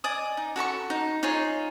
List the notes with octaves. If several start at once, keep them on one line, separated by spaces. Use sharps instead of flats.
D5 D#5 G#5 D#6
D#4
F#4 A4 A#5 C#6
D#4
D#4 F4 G#4 C#5